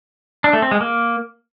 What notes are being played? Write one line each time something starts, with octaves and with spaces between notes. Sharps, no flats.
D4
A3
C4
G#3
A#3